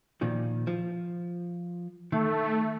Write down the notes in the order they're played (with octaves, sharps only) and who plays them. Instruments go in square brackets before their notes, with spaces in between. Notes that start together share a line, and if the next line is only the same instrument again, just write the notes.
[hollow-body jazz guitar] A#2 D#3 F3
F3
[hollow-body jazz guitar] D#3 [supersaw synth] A3